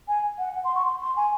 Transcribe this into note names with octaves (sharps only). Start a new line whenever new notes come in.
G#5
F#5
F#5
C6
C#6
C6
C6
G#5